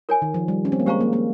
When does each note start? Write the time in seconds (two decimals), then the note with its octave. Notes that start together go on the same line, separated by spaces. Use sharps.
0.09 F4 A#4 C#5 G#5
0.22 D#3
0.34 F3
0.48 G3
0.65 C#4
0.72 C4
0.79 A#3
0.86 G#3 G4 C5 F5 A#5 C#6
1.01 A#3
1.13 A#3